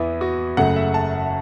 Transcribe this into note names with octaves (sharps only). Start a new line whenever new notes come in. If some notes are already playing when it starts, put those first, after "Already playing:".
Already playing: E2 E3 B3 E4
F#4
F#1 F#2 C#3 A3 F#5
E5
A5